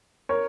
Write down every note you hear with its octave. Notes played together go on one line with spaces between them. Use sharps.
A#4 C#5